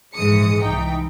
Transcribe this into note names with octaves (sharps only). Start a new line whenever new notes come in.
A#1 G#2 E3 G#3 D#6 C#7
C2 E3 D#4 G5